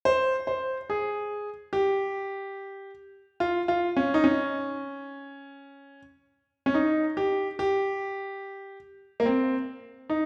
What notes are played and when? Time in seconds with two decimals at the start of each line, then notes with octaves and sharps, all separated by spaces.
0.05 C5
0.47 C5
0.90 G#4
1.73 G4
3.40 F4
3.68 F4
3.97 C#4
4.14 D#4
4.24 C#4
6.66 C#4
6.74 D#4
7.17 G4
7.59 G4
9.20 A#3
9.25 C4
10.10 D#4